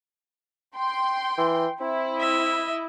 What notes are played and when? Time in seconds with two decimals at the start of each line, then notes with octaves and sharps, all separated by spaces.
0.76 G5 C6
1.38 E3
1.81 C4 E4
2.16 D#5 E5